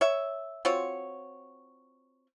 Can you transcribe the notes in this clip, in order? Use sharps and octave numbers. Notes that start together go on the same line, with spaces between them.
C#5 E5
C4 F4 F#4 C#5